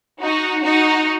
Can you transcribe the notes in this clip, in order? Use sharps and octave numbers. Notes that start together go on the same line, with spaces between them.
D#4 F#4
D#4 F#4